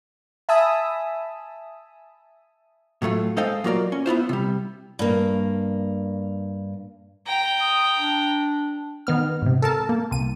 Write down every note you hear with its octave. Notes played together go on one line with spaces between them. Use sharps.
E5 G#5 A5 B5 D#6 E6
A2 F#3 A3 F4
G#3 A4 C5 D#5 F5 G5
F#3 A#3 F4 A#4 D5
C#4
B3 E4 F4 C5
C3 G3
G2 A#3
G5 A#5
D#6
D4
D#3 B3 F6
G#2 C3
A4 A#4 A5
A#3
C2 D#7